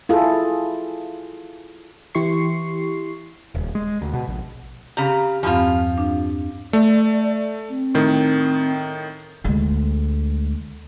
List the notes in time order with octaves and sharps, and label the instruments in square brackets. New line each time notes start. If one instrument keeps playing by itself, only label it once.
[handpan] E4 F4 G#4 A4
[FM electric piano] E3 E4 G4 C6 C#6 C7
[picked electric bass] D#1
G#3
D2
B2
A#1
[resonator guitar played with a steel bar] C#3 A#5 [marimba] G4
[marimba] E2 G2 C4 [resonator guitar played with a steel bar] F3 F4
[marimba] D4
[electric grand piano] A3 [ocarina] D5
[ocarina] C4
[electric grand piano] A2 D#3
[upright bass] D2 G#3